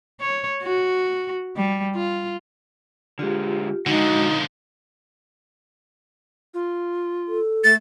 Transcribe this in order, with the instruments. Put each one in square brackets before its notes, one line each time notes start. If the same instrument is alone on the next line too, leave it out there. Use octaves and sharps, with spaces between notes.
[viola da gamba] C#5
F#4
G3
F4
[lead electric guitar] D3 G#3 [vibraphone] F4 G4
[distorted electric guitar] D3 F3 [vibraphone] G#3 G#5 [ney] D#4 [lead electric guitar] F#4
[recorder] F4
[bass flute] A4
[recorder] A3 [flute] A6